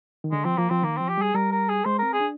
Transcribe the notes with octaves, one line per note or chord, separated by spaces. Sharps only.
D#3
D3 G#3
F3 C4
F3 A#3
F3 C4
D#3 A#3
F3 C4
G4
G3 G#4
G3 A#4
A#4
G#4
G#3 C5
C4 A#4
G#4
D4